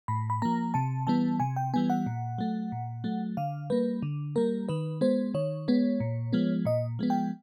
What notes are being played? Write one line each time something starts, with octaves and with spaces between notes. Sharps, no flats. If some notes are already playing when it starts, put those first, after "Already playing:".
A2 B5
B5
F3 A#3 A#5
C3 A5
E3 G3 B3 A5
C3 G#5
G5
E3 G3 B3 G#5
F#5
A#2
F#3 A3
A#2
F#3 A3
D3 F5
G3 A#3 B4
D3
G3 A#3 A#4
D#3 B4
G#3 B3 C5
D#3 C#5
G#3 B3
A#2
F3 G#3 B3
A#2 D#5
F3 G#3 B3
G5